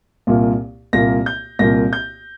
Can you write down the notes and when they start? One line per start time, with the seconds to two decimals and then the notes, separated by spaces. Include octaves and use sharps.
0.27 C2 A#2 A#3
0.93 C2 A#2 A#3 A#6
1.26 G6
1.59 C2 A#2 A#3 A#6
1.93 G6